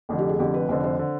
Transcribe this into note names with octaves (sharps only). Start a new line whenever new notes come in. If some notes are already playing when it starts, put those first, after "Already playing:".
F1 F2 D3
G4
G#4
F1 F2 D3 G4
B4
F1 F2 D3 C5
C5
D3